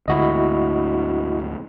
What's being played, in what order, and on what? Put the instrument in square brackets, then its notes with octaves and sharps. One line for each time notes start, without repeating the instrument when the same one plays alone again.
[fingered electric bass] D2 G#2 D3 [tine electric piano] E4 F#4 D#5